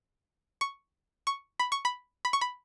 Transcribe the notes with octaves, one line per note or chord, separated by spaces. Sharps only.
C#6
C#6
B5
C#6
B5
B5
C#6
B5